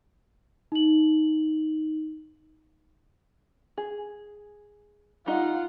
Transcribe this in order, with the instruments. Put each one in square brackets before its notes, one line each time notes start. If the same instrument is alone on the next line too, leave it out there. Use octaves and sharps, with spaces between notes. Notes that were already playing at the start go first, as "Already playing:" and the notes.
[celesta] D#4 F#7
[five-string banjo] G#4
[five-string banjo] G3 D#4 D#5 [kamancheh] F4 F#5